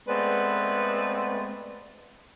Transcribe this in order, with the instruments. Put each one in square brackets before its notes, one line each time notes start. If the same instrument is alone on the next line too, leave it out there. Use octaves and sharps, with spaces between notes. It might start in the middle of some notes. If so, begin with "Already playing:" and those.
[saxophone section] G#3 A3 B3 C4 B4 D5